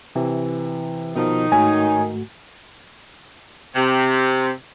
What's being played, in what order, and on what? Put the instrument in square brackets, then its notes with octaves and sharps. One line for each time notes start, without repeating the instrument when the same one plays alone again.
[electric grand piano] C3 [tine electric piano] E3
[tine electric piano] B2 F3 [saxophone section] D#3 D#4
[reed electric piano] G#2 A3 F#4 [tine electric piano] C#5 [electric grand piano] G#5
[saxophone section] C3